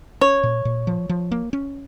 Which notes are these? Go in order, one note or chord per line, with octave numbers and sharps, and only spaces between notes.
C#4 C#5
A#2
A#2
F3
F3
A#3
C#4